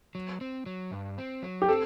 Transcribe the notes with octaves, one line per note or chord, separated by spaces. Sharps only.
F#3
C4
F#3
G2
C4
F#3
G4
C4 A4